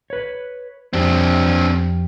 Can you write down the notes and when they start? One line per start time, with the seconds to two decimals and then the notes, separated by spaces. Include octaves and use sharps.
0.10 B4 C#5
0.93 F2 C4 D4 G4